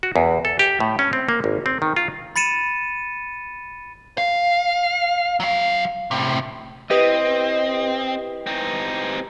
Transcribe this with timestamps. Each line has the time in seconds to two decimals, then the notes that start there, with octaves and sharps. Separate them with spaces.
0.03 F#4
0.16 E2
0.45 A4
0.59 G4
0.80 A2
0.99 C#4
1.13 C4
1.29 A#3
1.44 G#1
1.66 C4
1.82 D#3
1.96 F4
2.36 B5 A6 C#7 D#7 E7
4.18 F5
5.40 F#3 F5
6.11 A2 C3
6.91 C4 E4 G4 B4 D#5
8.47 C4 D#4